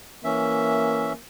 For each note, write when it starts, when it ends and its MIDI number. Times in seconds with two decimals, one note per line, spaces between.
0.24 1.13 52
0.24 1.18 58
0.24 1.13 61
0.24 1.13 76